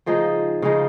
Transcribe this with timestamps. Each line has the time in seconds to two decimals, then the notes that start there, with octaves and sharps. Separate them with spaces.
0.06 C#3 F3 G#3 D#4
0.62 C#3 F3 G#3 D#4